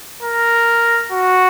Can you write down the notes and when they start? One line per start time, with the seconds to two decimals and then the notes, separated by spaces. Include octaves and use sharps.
0.23 A#4
1.12 F#4